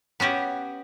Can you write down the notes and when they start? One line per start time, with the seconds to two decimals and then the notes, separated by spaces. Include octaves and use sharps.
0.20 B3 C#4 F#4 G4